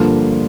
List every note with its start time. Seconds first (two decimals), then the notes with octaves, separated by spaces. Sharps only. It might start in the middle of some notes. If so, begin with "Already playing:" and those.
Already playing: G2 D3 F3 A#3